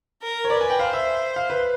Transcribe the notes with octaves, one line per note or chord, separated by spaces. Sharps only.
A#4
C#5
B4 D5
G#5
G5
C5 F5
E5
F5
B4